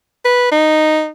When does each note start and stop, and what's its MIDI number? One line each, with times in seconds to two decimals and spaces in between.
0.25 0.49 71
0.52 1.08 63